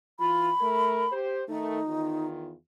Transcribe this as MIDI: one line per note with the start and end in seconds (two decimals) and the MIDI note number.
0.20 0.50 52
0.20 0.50 65
0.20 1.14 83
0.61 1.04 57
0.61 1.04 70
1.10 1.43 67
1.10 1.43 72
1.48 1.80 51
1.48 1.80 57
1.48 2.27 63
1.86 2.52 40
1.86 2.52 51
1.86 2.52 65